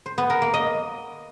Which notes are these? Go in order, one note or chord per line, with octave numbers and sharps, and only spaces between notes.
C5
B3
A#4
A#3
D#5